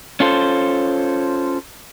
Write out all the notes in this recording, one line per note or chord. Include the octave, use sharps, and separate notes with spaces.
C#4 F4 A4 C5